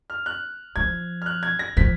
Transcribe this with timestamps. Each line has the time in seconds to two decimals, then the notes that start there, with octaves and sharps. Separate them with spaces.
0.10 F6
0.26 F#6
0.76 F3 G#6
1.22 F6
1.26 F#6
1.43 G#6
1.59 A#6
1.77 F3 B6